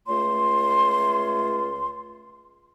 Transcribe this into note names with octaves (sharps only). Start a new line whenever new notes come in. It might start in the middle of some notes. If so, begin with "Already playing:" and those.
C#2 A3 F4 C#5 C6